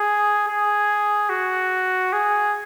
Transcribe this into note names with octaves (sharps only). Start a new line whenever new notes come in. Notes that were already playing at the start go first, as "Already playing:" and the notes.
Already playing: G#4
G#4
F#4
G#4